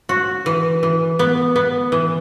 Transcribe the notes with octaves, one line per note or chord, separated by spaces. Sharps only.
F#4
E3
E3
B3
B3
E3